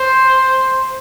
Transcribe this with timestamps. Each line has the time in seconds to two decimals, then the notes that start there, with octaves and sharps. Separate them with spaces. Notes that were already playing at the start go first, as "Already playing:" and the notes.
Already playing: C5